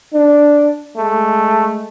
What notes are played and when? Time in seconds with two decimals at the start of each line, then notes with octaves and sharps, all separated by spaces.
0.14 D4
0.97 G#3 A3